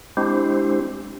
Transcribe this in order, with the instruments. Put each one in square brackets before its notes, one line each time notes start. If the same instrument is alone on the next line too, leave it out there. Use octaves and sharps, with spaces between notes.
[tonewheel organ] G#3 C4 D4 E4 G4 C5